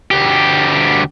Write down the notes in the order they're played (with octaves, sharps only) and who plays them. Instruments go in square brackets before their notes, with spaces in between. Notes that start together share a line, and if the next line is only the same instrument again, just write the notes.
[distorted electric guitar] D2 G4